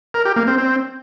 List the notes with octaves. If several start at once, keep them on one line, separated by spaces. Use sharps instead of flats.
A#4
G4
A#3
C4
C4